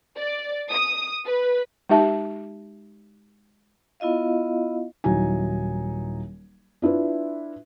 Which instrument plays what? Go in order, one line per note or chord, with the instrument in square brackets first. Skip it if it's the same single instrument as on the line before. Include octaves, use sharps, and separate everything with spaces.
[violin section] D5
D#6
B4
[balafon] G#3 D#4 G4 E5 A5
[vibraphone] B3 E4 F4 D#5 F5
[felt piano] D#1 F#3 D#4 E4 G#5
D4 E4 F4 B4